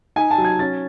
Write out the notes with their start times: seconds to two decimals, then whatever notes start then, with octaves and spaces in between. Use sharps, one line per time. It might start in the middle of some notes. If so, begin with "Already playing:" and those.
0.16 D#4 G#5
0.31 A5
0.38 F#3
0.45 G#6
0.59 C#4 A6